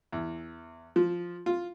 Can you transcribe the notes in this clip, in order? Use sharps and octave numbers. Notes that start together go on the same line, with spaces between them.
E2
F3
F4